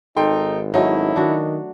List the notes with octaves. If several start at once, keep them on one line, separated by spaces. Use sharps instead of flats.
G#1 D#4 A4 G5 C6
F#3 A3 C#4 D#4 E4
D#3 D4 F#4